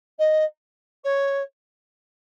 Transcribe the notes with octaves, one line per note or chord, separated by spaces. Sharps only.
D#5
C#5